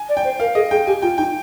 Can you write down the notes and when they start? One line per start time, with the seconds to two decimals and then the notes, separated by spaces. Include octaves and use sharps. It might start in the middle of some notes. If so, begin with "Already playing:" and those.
Already playing: G#5
0.09 D5
0.17 G5
0.25 C5
0.40 A#4 F5
0.55 G#4 D#5
0.71 G#4 G5
0.87 G4 G#5
1.02 F4 G5
1.17 D#4 G5